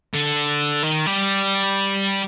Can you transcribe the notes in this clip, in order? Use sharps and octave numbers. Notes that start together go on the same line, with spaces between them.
D3
D#3
G3